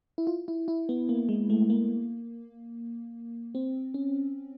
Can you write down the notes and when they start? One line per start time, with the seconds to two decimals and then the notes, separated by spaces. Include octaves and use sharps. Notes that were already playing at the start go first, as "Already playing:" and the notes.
0.18 E4
0.27 F4
0.48 E4
0.68 E4
0.89 B3
1.09 A#3
1.29 G#3
1.50 A3
1.70 A#3
3.55 C4
3.94 C#4